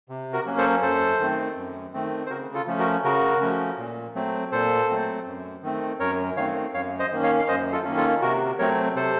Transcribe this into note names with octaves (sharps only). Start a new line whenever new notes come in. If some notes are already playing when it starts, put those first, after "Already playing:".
C3
F#4 A#4
F#3 A#3 C#4
A4 C5
F#2 A4 C5
D#3 A3 C4
F#2
D#3 A3 C4
C5
C#3 F#4 A#4
F4 A4
F3 A3 C#4
F#4 A#4
C#3 F#4 A#4
F3 A3 C#4
A#2
F#3 A3 C4
A#2 A4 C5
F#3 A3 C4
F#2
D#3 A3 C4
F#2 A#4 C#5
D#3 A3 C4 C#5 F5
F#2 C#5 F5
C5 D#5
D#3 A#3 C#4
C#5 F5
F5
F#2 C5 D#5
F4 A4
D#3 A#3 C#4
F4 A4
C3 F#4 A#4
F#3 A3 C4 A#4 C#5
C3 A4 C5